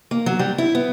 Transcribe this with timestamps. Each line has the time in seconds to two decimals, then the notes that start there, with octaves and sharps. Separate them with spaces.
0.11 A#3
0.26 F#3
0.39 G3
0.58 E4
0.75 B3